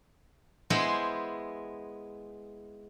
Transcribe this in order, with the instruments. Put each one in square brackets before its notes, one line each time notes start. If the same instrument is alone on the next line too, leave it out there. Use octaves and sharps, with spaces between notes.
[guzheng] G#3 B3 E4 C5